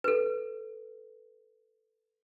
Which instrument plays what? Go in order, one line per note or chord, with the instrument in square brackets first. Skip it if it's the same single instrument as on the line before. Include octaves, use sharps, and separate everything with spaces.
[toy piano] A4 B4